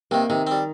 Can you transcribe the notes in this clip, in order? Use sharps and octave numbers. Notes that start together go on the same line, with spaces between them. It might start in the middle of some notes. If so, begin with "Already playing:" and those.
C3 D#3 A#3
C3 D#3
G3 C4